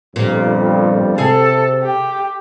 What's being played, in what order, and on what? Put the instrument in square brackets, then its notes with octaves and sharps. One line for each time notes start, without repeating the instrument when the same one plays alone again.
[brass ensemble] G1 F2 G3 [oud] A#2
[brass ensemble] C3 [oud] G#4 [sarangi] A4
[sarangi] G4